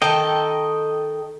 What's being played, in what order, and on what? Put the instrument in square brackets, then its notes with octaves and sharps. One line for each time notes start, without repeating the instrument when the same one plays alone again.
[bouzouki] D#3 A4 [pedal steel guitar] D#5 G5